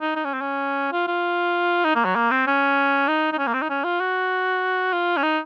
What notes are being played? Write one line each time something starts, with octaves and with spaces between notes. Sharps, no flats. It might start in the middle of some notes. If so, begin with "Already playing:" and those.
D#4
D#4
C#4
C4
C#4
F4
F4
D#4
A#3
F#3
A#3
C4
C#4
D#4
D#4
C#4
A#3
C4
D#4
C#4
F4
F#4
F4
C#4
D#4